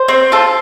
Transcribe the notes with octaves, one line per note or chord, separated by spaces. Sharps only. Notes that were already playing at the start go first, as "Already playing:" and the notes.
Already playing: C5
C4
F4 A4